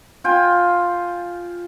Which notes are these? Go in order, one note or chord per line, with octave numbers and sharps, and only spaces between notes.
F4 G5 G#5